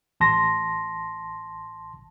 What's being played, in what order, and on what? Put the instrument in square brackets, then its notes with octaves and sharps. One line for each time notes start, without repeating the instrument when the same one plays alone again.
[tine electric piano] A1 A5 C6 A#6